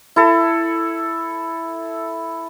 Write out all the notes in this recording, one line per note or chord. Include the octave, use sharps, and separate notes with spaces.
E4 A4